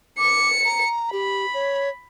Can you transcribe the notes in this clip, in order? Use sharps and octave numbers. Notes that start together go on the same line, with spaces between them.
D6 C#7
A#5
G4 B5
C#5